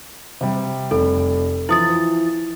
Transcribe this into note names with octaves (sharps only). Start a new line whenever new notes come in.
C3 G3
F1 A4
E3 F3 E4 D#6 A6